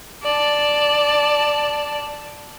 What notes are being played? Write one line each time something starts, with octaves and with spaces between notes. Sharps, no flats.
D5 A5